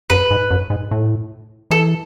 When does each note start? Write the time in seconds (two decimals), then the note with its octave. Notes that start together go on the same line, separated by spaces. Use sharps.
0.10 F#2 B4
0.31 G#2
0.51 F#2
0.70 G#2
0.91 A2
1.71 E3 A4